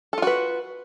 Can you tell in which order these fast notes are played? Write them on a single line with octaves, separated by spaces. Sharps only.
A4 F4 F#4 B4